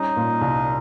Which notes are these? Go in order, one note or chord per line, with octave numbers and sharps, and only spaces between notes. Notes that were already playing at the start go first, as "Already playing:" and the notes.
Already playing: G3 C#4 D#4
A#2
C2